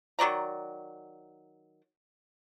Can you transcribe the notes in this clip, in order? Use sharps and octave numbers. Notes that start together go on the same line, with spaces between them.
D#3 F#3 D5 A#5